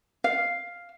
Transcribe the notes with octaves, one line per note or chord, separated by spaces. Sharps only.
F5